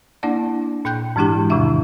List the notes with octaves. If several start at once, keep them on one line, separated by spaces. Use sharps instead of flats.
A#3 D4 E4 D5 F#5 A5
A#2 G5 F#6 G6
G#2 E3 G#3 D4 E4 G4
E2 A2 C3 D#3 E4 E5